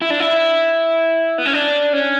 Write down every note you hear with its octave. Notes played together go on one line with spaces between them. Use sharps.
E4
D4
E4
B3
C#4
D4
C#4